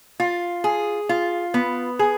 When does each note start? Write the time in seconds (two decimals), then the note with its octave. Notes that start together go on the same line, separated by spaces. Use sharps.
0.20 F4
0.64 G#4
1.09 F4
1.54 B3
1.99 G#4